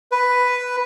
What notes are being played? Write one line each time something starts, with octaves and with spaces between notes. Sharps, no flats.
B4